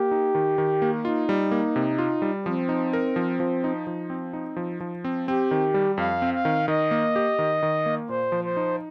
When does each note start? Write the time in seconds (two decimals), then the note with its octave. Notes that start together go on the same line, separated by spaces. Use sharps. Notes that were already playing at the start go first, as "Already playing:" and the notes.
Already playing: A#3 G4
0.11 D#4
0.35 D#3
0.58 D#3
0.82 A#3
1.04 D#4 F4
1.29 G3
1.51 A#3
1.76 C3
1.99 F4
2.22 G3
2.45 F3 C4
2.69 D#4
2.93 A#4
3.16 F3
3.40 F3
3.64 D#4
3.87 F3
4.10 C4
4.33 D#4
4.56 F3
4.80 F3
5.04 C4
5.28 C4 G4
5.51 D#3
5.74 G3
5.98 F2 F5
6.22 C4
6.34 F5
6.45 D#3
6.68 D#3 D#5
6.91 A#3
7.16 G4
7.39 D#3
7.63 D#3
7.86 A#3
8.09 A#2 C5
8.32 F3
8.44 C5
8.57 D#4